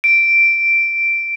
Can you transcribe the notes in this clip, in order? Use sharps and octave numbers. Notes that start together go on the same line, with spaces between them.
D7